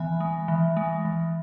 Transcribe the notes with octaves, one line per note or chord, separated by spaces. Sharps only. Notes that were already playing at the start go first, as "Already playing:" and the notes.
Already playing: E3 G#3 B3 G#5 B5
G#3
E3
G#3
E3